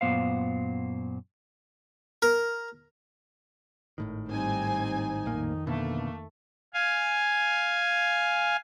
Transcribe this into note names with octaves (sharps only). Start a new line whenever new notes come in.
F#2 A#2 B3 C5 F5
A#4
G#1 A2 D#3
G#2 G3 C4 D#4 G#5
A#1 F2 A2 D#3 A#3
B2 D3 A3 A#3
F5 G#5